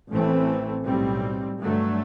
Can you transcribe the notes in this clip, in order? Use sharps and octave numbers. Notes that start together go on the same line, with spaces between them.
A1 A2 E3 A3 C4
B1 A2 G3 C4
G2 D3 F#3 A3